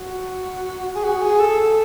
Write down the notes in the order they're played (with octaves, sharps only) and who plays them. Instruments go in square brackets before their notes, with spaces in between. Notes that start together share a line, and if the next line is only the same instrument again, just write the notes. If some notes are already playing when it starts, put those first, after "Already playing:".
Already playing: [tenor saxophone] F#4
G#4
F#4
G#4
A4